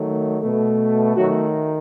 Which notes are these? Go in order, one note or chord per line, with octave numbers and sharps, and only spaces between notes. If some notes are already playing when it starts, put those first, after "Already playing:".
Already playing: D#3 F#3 A3
B2 A3
D#3 F#3 A3 F#4